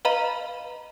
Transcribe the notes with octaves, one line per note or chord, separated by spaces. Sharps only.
B4 D#5 F5 A#5 B5 D#7